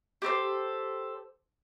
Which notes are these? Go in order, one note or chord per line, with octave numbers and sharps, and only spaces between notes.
G4 A4 A#4 C5